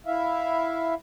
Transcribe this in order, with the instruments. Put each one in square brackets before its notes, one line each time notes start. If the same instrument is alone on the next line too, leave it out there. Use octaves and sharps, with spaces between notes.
[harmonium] E4 E5 F5